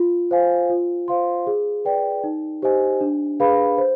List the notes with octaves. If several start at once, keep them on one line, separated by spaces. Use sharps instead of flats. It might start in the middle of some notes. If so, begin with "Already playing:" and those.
Already playing: F4
C5 F5 G#5
F4
C5 F5 C6
G#4
B4 D5 G5
D#4
G4 C5 D#5 G#5
D4
G#4 B4 F5 B5
C5